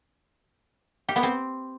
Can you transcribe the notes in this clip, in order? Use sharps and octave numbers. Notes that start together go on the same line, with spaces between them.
G4
B3
C4